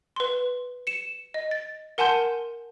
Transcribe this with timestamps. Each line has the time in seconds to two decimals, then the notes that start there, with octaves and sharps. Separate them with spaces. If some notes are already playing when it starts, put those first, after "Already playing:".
0.16 B4 C6
0.87 C#7 E7
1.34 D#5
1.51 A6
1.98 A#4 F#5 G#5 A5 C6 G6